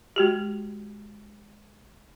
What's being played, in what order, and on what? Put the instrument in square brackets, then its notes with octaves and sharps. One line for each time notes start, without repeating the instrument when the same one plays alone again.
[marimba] G#3 F#4 G4